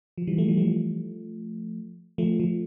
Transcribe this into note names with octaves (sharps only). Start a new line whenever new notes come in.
F3
E3 G3
F3 A3
E3 G3
F3 A3
F3 A3
F3